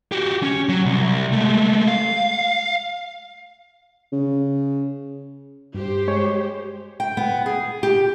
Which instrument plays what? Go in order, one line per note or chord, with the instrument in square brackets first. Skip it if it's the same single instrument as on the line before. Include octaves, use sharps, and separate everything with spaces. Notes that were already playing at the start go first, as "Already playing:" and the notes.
[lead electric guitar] F#4 G4
C#4
F#3
C2
G#3 A3
F5
[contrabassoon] C#3
[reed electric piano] G2 [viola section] G4 C5
[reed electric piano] G#3 C#5
[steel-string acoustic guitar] G5
B3
G#4
G4